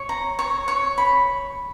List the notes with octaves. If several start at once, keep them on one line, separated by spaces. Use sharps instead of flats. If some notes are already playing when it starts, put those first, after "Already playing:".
Already playing: C#5
A#5
C#5
C#5
B5